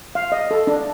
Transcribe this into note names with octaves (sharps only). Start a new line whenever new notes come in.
F5
D#5
A4
D4